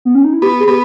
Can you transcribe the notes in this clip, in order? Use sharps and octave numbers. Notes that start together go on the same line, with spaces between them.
B3
C#4
D#4
E4
B3 G4
G#4
B3 G4